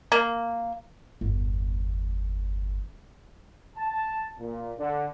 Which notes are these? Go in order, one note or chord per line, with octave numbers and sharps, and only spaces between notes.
A#3
G1 E2
A5
A#2
D3